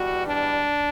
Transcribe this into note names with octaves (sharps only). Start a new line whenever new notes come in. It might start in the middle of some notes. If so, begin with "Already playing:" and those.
Already playing: E2 B2 G3 F#4
D4